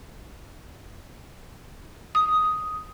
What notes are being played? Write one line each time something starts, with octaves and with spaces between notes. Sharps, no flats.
D#6